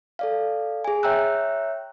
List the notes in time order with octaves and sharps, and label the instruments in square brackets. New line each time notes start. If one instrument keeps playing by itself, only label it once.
[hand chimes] A4 D5 F5
G#4 G#5
C#5 E5 G5 A#5 E6 F#6